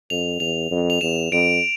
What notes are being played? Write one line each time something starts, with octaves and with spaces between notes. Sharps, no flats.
F2 F7
E2 F7
F2
F7
E2 E7
F2 D7